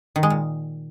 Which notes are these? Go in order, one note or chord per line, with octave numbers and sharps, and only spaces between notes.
D#3
G#3
A#2